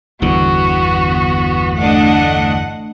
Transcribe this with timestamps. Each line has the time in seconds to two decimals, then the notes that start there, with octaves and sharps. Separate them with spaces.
0.22 G1 E2 D3 B3 F#4
1.77 A3 D4 D#5 F#5